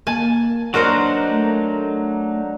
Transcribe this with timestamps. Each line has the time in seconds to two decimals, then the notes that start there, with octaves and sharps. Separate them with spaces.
0.07 A#3 G#5 A5
0.74 F#3 D4 D#4 F#4 A#4 C5
1.30 A3